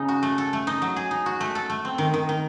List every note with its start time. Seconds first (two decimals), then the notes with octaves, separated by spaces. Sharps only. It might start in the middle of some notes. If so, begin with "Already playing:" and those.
Already playing: C#3 D#4
0.08 F#4
0.23 A3
0.38 A4
0.53 A3
0.67 D#4
0.82 F#3
0.96 G#4
1.11 D#4
1.26 F#4
1.40 A3
1.55 A4
1.70 A3
1.85 C4
1.98 D#3
2.14 D#3
2.29 D#3